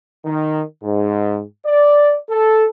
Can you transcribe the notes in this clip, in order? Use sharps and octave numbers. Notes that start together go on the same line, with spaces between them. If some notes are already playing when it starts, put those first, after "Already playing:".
D#3
G#2
D5
A4